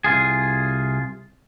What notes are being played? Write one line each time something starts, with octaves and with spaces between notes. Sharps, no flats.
C2 G2 F4 G#4